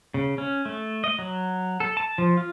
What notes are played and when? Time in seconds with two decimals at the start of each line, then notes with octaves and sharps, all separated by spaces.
0.14 C#3
0.38 C#4
0.65 A3
1.04 D#5
1.19 F#3
1.80 A4
1.97 A5
2.18 F3
2.37 F4